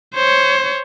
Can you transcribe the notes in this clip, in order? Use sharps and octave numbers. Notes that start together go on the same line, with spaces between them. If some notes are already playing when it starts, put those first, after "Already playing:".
C5 C#5